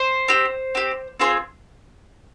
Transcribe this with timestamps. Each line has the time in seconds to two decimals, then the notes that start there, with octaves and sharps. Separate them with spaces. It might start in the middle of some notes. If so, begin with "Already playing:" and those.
Already playing: C5
0.28 C4 G4
0.75 C4 G4
1.20 C4 F4 G#4 C5